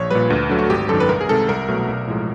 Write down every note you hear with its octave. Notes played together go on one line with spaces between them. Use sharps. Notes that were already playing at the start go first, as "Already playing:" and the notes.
Already playing: A#1 C#5
A#2 G3 B4
D2
D3 F#3 A3
F#4
G#1 G4
F#2 D#3 A4
B4
C2 A#4
G#4
C3 D#3 G#3 A4
C2 A#4
B2 F#3 A3
B1
A2 F3 G#3